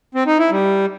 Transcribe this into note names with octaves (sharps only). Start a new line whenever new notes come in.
C4
D#4
E4
G3